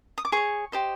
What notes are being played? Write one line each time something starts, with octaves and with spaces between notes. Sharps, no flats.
D#6
D6
G#4 C#5 C#6
G4 C5 D#5